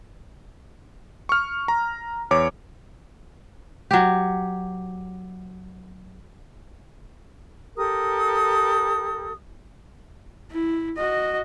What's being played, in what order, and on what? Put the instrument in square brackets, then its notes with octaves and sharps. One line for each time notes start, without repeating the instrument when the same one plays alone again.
[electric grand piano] C#6 F6
A#5
E2 C#5 D6
[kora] F#3 G4
[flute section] G4 A4 A#4 D#6
[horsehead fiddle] E4
F#4 D#5